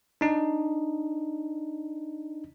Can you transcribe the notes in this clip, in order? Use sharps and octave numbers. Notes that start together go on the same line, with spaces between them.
D4 D#4